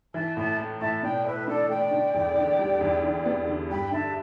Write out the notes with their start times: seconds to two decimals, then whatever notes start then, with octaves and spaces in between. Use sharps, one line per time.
0.13 E3 E5 A5
0.36 A2 E5 A5
0.59 A3
0.80 A2 E5 A5
1.03 B2 D5 G5
1.25 A3 B4 E5
1.39 E5
1.47 D4 A4 D5
1.69 A3 D5 G5
1.91 D3
2.14 E2
2.36 D3
2.59 G3
2.81 E2
3.03 D3
3.26 B3
3.47 D3
3.70 G2 G5 B5
3.92 D3 E5 A5